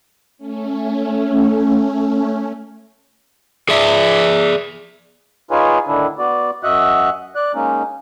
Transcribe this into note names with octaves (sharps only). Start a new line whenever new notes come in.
A3 C#4
G#4 D5 E5
D#4 F4 G#4 B4 C#5 G#5
A2 D3 D#3 D4 E4
B3 F#4 D5
F#2 F#4 D#5 E5 F#5 F#6
D5 F#6
G#3 A#3 C#4 D#4